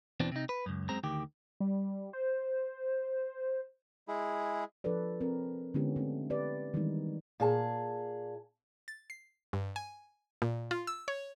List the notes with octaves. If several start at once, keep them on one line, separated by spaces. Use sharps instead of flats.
E2 B2 E3 C4 D4
C3 D#4
B4
C#2 F#2
F#2 G#3 C4 A#5
D2 D#3 G4
G3
C5
G#3 E4 G#4
F3 D4 A4 B4 D5
C4 A#4
D3 G#3 B3 C#4 E4 G4
A3 C4 D4
G4 B4 D5
D#3 E3 G3 G#3 B3 D#4
A#2 G#4 A5
A6
C7
G2
G#5
A#2
F4
E6
C#5